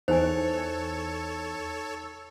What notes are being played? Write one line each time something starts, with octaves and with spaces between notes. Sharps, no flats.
E2 D#4 A4 C5 C#5 G#5